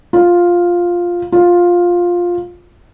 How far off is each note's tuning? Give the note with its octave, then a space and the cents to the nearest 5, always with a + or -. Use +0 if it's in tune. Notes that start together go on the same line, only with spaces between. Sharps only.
F4 +5
F4 +10